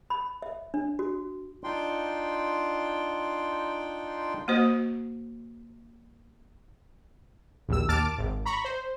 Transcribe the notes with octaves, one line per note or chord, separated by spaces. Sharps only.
B5
E5
D4
F#4
D4 D#4 F4 G5 C6
A#3 F#4 C5 D#5
A#1 D#2 E6
D#2 A5 D6 F6 A6 D7
G#1
A#5 B5 C#6
C5